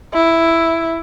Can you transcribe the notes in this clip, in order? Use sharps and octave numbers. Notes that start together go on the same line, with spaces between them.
E4